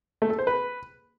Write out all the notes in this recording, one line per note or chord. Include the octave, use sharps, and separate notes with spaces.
A3
A4
C5
B4